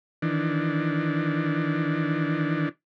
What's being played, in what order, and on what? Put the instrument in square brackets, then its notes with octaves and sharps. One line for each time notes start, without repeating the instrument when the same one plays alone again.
[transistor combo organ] D#3 E3 D4